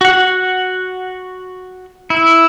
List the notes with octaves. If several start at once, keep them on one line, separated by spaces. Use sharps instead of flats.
F#4 F#5
E4